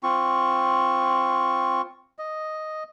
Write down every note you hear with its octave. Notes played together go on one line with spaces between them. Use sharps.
C4 F4 C#6
D#5